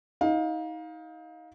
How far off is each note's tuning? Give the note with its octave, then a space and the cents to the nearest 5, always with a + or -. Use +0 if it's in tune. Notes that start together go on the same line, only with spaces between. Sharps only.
D#4 +30 F5 +20